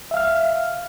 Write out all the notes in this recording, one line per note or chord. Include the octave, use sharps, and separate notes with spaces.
E5 F5 F6